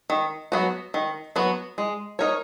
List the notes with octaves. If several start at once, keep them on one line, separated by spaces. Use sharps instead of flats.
D#3
F#3 B3 F#4
D#3
F#3 B3 F#4
G#3
D#4 A#4 C#5